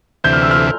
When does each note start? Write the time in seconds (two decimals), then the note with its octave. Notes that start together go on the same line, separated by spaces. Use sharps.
0.24 D2 C3 E3 G6
0.33 F6
0.42 E6
0.51 F6